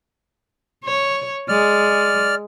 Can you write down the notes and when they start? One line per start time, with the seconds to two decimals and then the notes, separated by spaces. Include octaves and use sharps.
0.84 C#5
1.49 G#3 D5 F6